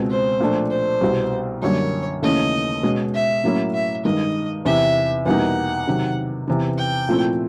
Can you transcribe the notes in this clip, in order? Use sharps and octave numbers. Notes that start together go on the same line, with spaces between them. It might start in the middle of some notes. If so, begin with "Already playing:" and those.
Already playing: C#2 B2 G#3 C4
C5
A#2 F3 A3 D4
C5
C2 B2 G3
F#2 D3 G3 A#3 C#5
D#2 C#3 E3 A3 C#4 D#5
B2 G#3 C#4
E5
A2 F#3 A#3 C#4 E4
E5
G2 D#3 G#3 D#5
E2 C3 E3 E5
E2 B2 G3 A#3 D#4 F#5
C3 D#3 F#3
E2 C3 E3
G5
A#2 F3 A3 C4 E4